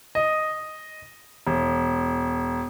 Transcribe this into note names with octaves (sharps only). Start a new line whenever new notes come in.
D#5
E1